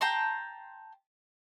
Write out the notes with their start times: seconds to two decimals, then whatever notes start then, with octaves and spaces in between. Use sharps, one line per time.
0.01 G5 A5 A#5 C6